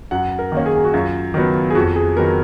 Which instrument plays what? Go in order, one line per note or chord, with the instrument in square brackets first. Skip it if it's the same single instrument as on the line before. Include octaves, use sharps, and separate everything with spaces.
[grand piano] F#2 F#5
A#4
D#3 A#3 C#4
G#4
G#4
F#4
F#2 F4
D#3 F#3 B3
G#4
F2 F#4
G#4
D#3 F#3 B3 A#4